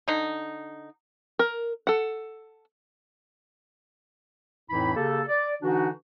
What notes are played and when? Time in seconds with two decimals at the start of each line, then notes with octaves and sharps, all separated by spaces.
0.08 D3 D#4
1.39 A#4
1.87 A4 F#5
4.70 F2 A2 E3 D#4 E4 B5
4.94 C#3 A#3 G4 A4
5.27 D5
5.62 D3 E3 D4 D#4 F#4